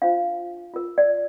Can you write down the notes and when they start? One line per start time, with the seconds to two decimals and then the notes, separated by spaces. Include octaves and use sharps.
0.02 D4 F4 C5 F5
0.74 F4 A#4
0.98 D5